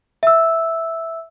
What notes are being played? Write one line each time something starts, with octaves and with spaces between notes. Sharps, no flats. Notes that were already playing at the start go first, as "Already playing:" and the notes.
E5 E6